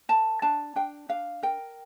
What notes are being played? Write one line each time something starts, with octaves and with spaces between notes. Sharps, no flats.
A#4 A5
D4 A5
D4 G5
D4 F5
A#4 G5